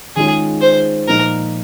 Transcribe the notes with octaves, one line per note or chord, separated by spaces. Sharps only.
D#3 G#3 C#4 F4 G#4
C5
A#2 F3 A#3 D#4 A#4